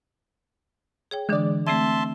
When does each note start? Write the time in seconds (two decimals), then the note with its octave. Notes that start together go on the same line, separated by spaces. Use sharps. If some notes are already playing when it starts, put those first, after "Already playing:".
1.11 G#4 C#5 G5
1.29 D3 E3 G#3 D4 D5
1.67 A3 C4 E5 A5 C6 G#6